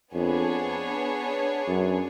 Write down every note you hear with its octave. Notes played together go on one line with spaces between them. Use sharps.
F2 B3 D4 G#4 C#5
F#2